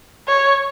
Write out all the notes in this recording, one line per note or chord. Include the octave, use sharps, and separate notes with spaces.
C#5